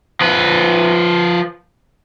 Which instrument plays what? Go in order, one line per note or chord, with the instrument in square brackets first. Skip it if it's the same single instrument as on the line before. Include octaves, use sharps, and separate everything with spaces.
[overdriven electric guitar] F3 B4